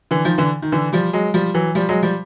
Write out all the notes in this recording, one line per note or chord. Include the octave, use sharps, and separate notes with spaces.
D3 E3
D#3 F3
D3 E3
D#3
D3 E3
F3 G3
F#3 G#3
F3 G3
E3 F#3
F3 G3
F#3 G#3
F3 G3